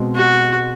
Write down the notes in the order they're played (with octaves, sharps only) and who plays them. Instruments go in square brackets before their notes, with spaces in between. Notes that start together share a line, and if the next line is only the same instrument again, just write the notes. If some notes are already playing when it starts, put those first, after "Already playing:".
Already playing: [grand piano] B2 G#3 C4
[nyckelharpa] F#4